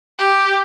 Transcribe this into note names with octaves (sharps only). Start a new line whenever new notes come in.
G4